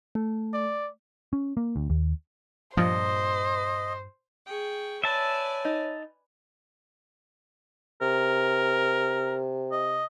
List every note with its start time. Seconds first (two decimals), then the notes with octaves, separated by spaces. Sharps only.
0.15 A3
0.53 D5
1.33 C#4
1.57 A#3
1.76 D2
1.90 D#2
2.77 G2 A#2 F3 C5 D#5
4.45 G#4 G5 C#6
5.04 B4 C#5 D5 E5 G#5 A5
5.65 D#4
8.01 C3 A#4
9.72 D#5